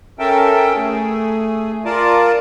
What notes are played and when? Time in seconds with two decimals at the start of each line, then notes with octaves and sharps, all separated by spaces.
0.19 C#4 A4 A#4 E5 G5 A5
0.75 A3 G#4
1.85 F4 A#4 D5 A5